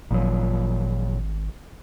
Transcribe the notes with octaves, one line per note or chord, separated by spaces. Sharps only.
G#1 A#2 F3 F#3